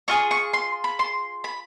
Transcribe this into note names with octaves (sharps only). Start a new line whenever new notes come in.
D4 F4 G#4 C#6
C#6
C6
B5
C6
B5